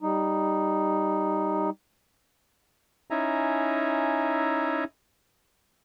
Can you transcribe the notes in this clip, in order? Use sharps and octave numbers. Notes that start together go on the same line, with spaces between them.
G3 D#4
C#4 D#4 E4 E5 G#5 A#5